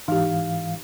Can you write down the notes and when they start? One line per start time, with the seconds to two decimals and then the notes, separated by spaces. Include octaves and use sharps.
0.08 G#2 E3 D#4 G4 F5